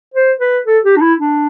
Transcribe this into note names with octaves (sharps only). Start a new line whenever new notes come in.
C5
B4
A4
G4
D4
E4
D4